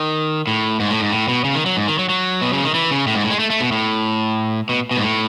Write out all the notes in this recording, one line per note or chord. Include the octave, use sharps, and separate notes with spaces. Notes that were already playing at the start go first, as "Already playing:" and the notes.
Already playing: D#3
A2
G#2
A2
G#2
A2
B2
C#3
D#3
F#3
G#2
D#3
F#3
F#3
B2
C#3
D#3
E3
C#3
A2
G#2
A2
G#3
A3
A3
B2
A2
B2
B2
G#2
A2